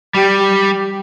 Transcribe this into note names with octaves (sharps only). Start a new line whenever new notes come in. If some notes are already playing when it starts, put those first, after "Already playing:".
G3 G4